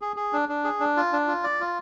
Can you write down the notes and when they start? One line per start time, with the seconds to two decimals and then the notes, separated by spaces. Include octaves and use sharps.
0.01 G#4
0.16 G#4
0.33 D4
0.49 D4
0.64 G#4
0.80 D4
0.97 F4
1.13 D4
1.27 F4
1.44 D5
1.60 F4